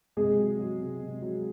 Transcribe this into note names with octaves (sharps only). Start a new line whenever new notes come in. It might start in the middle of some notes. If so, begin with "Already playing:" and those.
C3 G#3 G#4
F#3
F#3
C3
C3
F#3